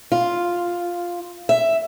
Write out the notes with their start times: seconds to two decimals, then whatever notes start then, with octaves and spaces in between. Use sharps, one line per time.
0.12 F4
1.49 E5